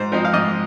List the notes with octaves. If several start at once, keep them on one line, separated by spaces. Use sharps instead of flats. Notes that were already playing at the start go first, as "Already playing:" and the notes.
Already playing: G#2 C5
F3 C4 D#4
F5
G#2 D#5